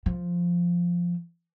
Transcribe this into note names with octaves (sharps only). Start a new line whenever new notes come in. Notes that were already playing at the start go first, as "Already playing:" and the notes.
F3